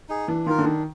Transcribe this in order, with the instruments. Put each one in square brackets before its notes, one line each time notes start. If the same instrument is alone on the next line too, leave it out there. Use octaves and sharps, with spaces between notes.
[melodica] D#4 G#4
[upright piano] E3 [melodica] D4
[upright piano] D#3 [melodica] F4 A#4
[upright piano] D3
[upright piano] D#3 [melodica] D4